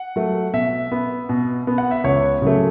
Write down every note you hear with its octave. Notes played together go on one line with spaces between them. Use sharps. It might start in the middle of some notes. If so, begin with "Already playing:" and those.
Already playing: F#5
F#3 A3
B2 E5
B3
B2
B3
F#5
E5
C#2 C#5
C#3 F#3 A3